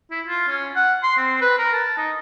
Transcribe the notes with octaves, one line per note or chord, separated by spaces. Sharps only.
E4
F4
C#4
F#5
C6
C4
B4
A#4
A5
D#4